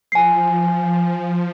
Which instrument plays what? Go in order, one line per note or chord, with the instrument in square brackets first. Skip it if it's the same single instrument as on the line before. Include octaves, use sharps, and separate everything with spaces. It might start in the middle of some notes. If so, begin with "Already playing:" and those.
[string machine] F3 [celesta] G#5 C7